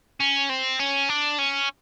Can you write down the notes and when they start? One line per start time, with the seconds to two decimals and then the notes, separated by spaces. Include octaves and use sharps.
0.20 C#4
0.50 C4
0.79 C#4
1.09 D4
1.38 C#4